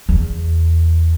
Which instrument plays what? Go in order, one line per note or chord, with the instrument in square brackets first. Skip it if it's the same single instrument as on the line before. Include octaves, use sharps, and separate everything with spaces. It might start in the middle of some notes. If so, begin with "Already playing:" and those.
[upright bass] E2